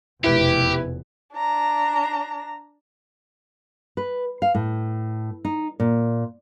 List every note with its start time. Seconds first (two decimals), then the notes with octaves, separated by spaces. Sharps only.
0.24 F1 E2 B2 E4 G4 B4
1.35 D4 A#5
3.97 B4
4.42 F5
4.55 A2
5.45 D#4
5.80 A#2